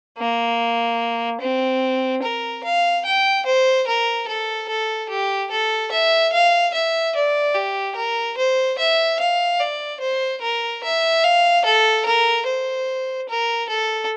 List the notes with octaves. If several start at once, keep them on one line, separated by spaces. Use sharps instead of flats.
A#3
C4
A#4
F5
G5
C5
A#4
A4
A4
G4
A4
E5
F5
E5
D5
G4
A#4
C5
E5
F5
D5
C5
A#4
E5
F5
A4
A#4
C5
A#4
A4